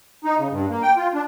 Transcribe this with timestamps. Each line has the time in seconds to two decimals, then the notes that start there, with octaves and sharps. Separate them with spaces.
0.24 D#4
0.39 C#3
0.51 G2
0.70 A#3
0.82 G5
0.97 F4
1.14 D4